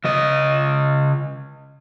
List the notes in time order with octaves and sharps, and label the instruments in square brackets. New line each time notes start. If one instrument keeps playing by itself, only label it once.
[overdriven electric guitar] C#3 D#5